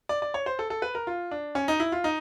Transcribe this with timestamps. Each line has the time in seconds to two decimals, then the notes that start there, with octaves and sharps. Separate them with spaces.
0.09 D5
0.22 D5
0.34 C#5
0.46 C5
0.59 A4
0.70 A4
0.82 B4
0.95 A#4
1.07 F4
1.31 D4
1.55 C#4
1.68 D#4
1.80 E4
1.92 F4
2.04 D#4